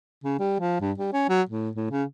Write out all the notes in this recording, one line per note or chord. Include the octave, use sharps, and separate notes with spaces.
C#3
G3
F3
G2
G3
C#4
F#3
A2
A2
C#3